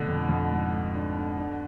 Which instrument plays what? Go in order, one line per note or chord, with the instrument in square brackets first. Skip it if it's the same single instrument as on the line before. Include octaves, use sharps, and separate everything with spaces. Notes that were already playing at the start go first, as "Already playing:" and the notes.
Already playing: [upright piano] B2 D3 [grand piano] A3 D4
[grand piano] F2
F2
G#2
G#2
D4
D4
D4